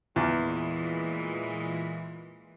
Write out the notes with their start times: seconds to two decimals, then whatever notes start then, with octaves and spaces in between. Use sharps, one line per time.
0.16 E2 A#2 E3 G#3